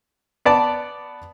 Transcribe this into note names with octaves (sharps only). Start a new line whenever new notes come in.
B3 D5 A5